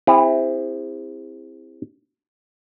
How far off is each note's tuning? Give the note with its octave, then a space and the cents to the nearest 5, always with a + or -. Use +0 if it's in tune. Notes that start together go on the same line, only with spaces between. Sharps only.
C4 +0 E4 +0 G#4 -45